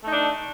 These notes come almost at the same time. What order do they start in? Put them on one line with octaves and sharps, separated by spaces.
A3 D#4 D4